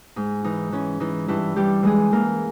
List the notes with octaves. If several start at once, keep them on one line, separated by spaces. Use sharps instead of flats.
G#2 D#4
E3 D#4
E3 C#4
E3 D#4
G2 E3 E4
E3 G3 G4
E3 G#3 G#4
E3 A#3 A#4